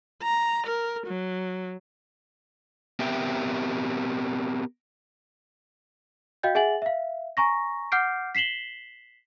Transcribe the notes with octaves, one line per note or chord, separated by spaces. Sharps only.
A#5
A#4
F#3
B3 C4 G4 A#4 E5 G5
F#4 D#5 F5 G5 G6
G#4 E5 F#5 G#5 A6 F#7
E5 F5
G#5 A#5 C#6 A#6
F#5 D6 F6 G6 C7 D7
B6 C7 E7 F#7 G7